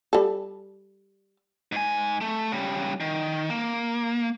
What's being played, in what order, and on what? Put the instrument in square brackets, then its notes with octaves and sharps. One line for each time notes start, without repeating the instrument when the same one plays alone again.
[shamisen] G3 A4
[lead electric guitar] G#2 G#5
A3
C#3 G3
D#3
A#3